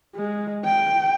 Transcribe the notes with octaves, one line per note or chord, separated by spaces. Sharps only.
G#3
G5